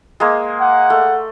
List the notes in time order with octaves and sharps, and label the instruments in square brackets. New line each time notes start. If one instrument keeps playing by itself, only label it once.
[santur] G#3 A#3
[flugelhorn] F#5
[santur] A3